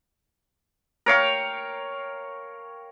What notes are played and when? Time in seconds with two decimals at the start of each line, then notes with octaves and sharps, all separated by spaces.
1.06 A#4 C#5 F5 G5